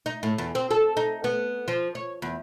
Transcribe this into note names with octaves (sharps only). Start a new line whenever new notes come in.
D#4
A2
E2
C4
A4
D#4
B3
F3
C#5
E2